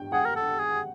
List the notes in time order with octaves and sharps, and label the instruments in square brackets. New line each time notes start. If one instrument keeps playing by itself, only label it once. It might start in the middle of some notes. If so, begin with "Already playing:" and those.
Already playing: [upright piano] G5
[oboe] G#4 [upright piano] F#5
[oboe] A#4
A4
G#4